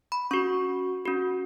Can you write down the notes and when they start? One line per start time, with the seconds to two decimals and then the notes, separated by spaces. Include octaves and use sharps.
0.12 B5
0.31 C#4 F#4 C#6
1.05 C#4 F#4